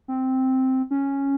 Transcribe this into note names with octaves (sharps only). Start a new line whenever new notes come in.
C4
C#4